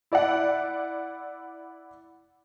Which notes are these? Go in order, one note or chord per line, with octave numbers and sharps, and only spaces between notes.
E4 D5 E5 F#5